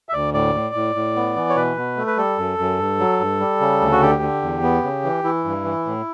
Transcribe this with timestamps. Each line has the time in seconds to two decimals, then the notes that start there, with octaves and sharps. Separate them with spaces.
0.09 E5
0.13 D2 D5
0.34 A2 D5
0.55 A2
0.75 A2
0.95 A2
1.16 B3
1.36 E3
1.49 C#5
1.56 B2 B4
1.77 B2
1.97 A3
2.07 B4
2.17 G3 A4
2.38 F#2
2.59 F#2
2.79 G2
2.99 F#3
3.19 G2
3.40 G3
3.60 C#3
3.81 D2
3.92 F#4
4.01 D3 G4
4.22 D3
4.42 E2
4.63 B3
4.83 C#3
5.04 E3
5.24 E3 E4
5.45 G2
5.65 E3
5.86 A2